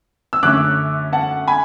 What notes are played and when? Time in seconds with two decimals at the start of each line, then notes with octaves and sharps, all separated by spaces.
0.33 E6
0.43 F#2 D3 A3 C#4 D6 F#6
1.13 F#5 A5
1.47 G#5 B5